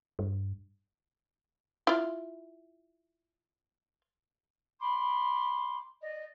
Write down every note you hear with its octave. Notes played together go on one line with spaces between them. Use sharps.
G2
E4 F4
B5 C6 D6
D5 D#5